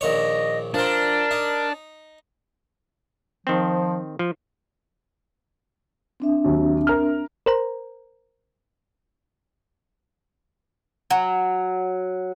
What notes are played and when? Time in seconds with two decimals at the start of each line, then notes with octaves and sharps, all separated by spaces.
0.01 A#1 D#3 C#5 D#5
0.74 F3 C4 D4 A#4
1.31 D#4
3.47 D#3 F3 C4
4.19 F3
6.20 C4 D4 E5
6.44 D#2 F#3
6.87 A#4 F6
7.46 A#4 C5 A#5
11.11 F#3